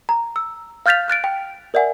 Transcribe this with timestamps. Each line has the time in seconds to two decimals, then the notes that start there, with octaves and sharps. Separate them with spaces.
0.09 A#5
0.36 E6
0.86 F5 F6 G6 A6 B6 F7
1.08 F6 F#6 A6 D7
1.24 G5
1.74 A#4 D5 E5 F#5 G#5